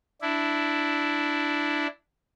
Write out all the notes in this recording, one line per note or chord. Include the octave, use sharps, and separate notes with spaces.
D4 E4